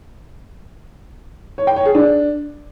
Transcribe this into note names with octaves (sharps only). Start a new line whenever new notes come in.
C#5
G5
C#5
G#4
D4